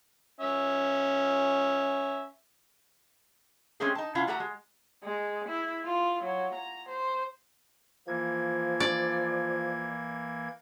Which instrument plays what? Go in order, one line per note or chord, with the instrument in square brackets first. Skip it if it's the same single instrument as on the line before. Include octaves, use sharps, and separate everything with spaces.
[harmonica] C#4 E5
[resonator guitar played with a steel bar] G#3 A3 C4 C#4 G4 G#4
D#4 A5
C3 C#4 E4 F4 F5 F#5
A3 F#4 G4 A4 F#5 A#5
G#3
[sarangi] G#3
E4
F4
F#3
A#5
C5
[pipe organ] E3 A#3 G#6 [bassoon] F3
[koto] D5